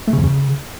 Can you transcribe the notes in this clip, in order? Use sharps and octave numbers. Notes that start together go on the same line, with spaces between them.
A3
C#3
F2
C#3